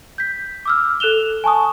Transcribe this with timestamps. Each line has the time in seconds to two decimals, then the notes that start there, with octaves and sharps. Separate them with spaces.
0.18 G6 B6
0.66 D6 E6 F6
1.00 A4 F#6 E7 F7 G7
1.44 G#5 A5 C#6 D#6